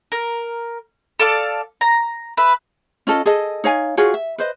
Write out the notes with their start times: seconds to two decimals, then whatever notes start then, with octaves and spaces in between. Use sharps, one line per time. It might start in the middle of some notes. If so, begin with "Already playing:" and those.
0.12 A#4
1.19 A4 D5 F5 D6
1.81 A#5
2.37 B4 E5
3.07 C#4 F4 A4 D#5
3.26 G#4 A4 D#5
3.64 D#4 C#5 F5 G#5
3.97 F4 F#4 G#4 C#5
4.14 E5
4.38 B4 C5 D#5